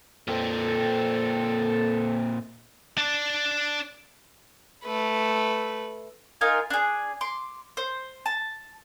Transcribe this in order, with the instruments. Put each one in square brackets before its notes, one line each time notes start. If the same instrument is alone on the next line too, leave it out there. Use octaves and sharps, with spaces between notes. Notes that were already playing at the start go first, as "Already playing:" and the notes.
[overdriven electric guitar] A#2 C4 [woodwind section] A4
[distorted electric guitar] D4 D5
[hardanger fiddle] A3 B4
[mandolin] D#4 F4 A#4 G#5
D4 G#4
C6 D6
C5
A5